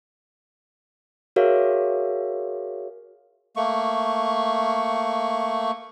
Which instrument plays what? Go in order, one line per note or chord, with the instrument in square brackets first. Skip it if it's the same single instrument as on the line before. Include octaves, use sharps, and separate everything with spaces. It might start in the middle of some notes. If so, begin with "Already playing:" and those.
[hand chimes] F#4 G#4 A#4 C#5 E5 F5
[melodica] A3 A#3 C#6